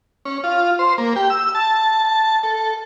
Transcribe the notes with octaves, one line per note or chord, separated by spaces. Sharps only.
C#4
F4
C5
A#3
G4
E6
A5
A5
A4